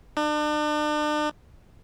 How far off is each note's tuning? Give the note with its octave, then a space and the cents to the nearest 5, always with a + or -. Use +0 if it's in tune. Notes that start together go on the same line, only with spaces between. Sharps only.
D4 +40